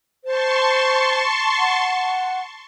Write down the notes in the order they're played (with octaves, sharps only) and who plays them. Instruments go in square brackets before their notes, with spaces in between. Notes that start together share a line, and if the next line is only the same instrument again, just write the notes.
[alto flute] C5 [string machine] A5 C6 C#6
[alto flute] F#5